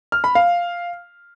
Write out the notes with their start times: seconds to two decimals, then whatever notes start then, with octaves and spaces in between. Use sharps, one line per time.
0.12 F6
0.24 B5
0.35 F5